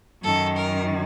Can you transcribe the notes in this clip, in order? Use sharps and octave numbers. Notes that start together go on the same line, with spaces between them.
F#2 D#3 A4
A#4